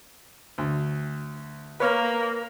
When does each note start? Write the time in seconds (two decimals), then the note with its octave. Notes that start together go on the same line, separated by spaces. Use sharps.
0.58 D2
1.80 A#3 A#4 B4 C#5 F6